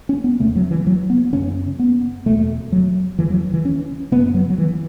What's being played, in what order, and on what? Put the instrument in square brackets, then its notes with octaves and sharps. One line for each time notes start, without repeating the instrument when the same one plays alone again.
[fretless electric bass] C#4
B3
E2 C#3 A3
F#3
E3
F#3
B3
F#2 C#3 C#4
B3
E2 B2 A3
F#3
E2 C#3 E3
F#3
E3
C#4
F#2 C#3 B3
F#3
F#3
E3